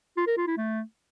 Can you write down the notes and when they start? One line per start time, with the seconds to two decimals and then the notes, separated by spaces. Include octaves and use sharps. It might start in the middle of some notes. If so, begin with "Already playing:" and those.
0.17 F4
0.27 A#4
0.37 F4
0.47 E4
0.57 A3